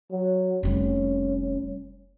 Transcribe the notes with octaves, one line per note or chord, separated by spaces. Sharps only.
F#3
F1 G3 C#4